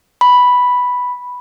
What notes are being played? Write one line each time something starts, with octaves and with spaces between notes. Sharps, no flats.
B5